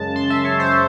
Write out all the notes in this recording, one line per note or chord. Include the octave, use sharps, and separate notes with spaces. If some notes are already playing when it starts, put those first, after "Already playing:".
Already playing: F#2 C#3 G#3 A5
C6
E5
C#5
C5